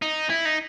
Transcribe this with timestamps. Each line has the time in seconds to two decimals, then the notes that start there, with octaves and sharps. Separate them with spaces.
0.02 D#4
0.30 E4
0.45 D#4